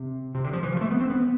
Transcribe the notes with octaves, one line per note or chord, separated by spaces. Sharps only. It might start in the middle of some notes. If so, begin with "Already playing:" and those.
Already playing: C3
C3
D3
F3
E3
F3
A3
B3
C4
B3